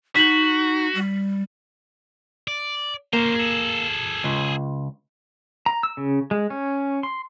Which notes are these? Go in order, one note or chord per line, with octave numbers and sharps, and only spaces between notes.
D#4 F#4 B6 F#7
G3
D5
A#3 C#4 C5
G#4 A4
C#2
A#5
E6
C#3
G#3
C#4
C6